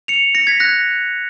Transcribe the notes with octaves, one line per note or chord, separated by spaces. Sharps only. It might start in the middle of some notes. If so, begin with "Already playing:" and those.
C#7 F7
A#6 C#7
G#6 B6
F#6 A#6